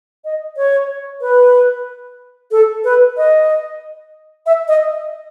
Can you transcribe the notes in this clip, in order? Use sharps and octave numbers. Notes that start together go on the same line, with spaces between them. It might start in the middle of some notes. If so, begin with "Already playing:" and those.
D#5
C#5
B4
A4
B4
D#5
E5
D#5